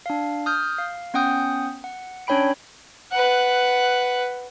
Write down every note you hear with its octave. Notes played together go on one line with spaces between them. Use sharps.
D4 F5
D#6 F6 G6
F5
B3 C#4 F#5 G5 D#6 G6
F#5
C#4 D4 C#5 G5 B5 D7
B4 F#5